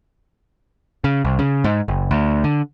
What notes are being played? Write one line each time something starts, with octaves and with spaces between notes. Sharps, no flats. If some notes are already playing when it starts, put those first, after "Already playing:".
C#3
C2
C#3
G#2
F#1
D2
D3